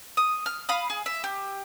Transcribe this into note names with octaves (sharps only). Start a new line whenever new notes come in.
D#6
F6
F5 B5 D#6
G#4
E5
G4